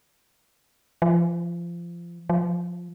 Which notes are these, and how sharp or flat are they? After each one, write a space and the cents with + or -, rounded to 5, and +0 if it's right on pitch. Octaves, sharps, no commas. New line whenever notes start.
F3 -25
F3 +10